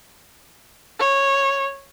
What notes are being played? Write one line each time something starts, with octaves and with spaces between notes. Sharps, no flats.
C#5